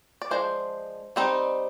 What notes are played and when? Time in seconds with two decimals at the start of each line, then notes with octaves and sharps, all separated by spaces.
0.22 D5
0.31 F3 G#3 D4 C5
1.16 G3 C4 D#4